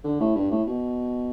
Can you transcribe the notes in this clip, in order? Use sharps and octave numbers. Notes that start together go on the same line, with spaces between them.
D3
A2
G2
A2
B2